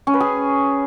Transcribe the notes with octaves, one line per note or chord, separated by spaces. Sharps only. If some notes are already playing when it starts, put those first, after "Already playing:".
C#4
B4
G#4